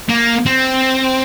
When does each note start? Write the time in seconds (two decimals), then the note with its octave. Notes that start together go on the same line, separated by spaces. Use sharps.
0.09 A#3
0.46 C4